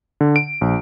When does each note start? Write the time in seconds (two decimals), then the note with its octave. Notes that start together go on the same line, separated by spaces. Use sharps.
0.21 D3
0.36 D7
0.61 A#1